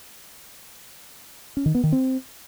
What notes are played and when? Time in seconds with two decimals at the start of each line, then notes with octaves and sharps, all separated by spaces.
1.57 C#4
1.66 D#3
1.75 B3
1.84 D#3
1.92 C4